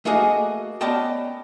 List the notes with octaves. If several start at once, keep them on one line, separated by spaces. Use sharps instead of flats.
A3 A#3 F#4 G#4 D#5
B3 C#4 D5 D#5 G5 A5